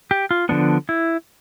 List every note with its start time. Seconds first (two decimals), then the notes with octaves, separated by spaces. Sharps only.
0.11 G4
0.31 F4
0.49 D3 F3 B3 D4
0.89 E4